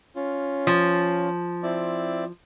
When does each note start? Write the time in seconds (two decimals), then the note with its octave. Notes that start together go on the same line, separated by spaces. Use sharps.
0.16 C#4 F4
0.67 F3
1.63 C4 E4 D5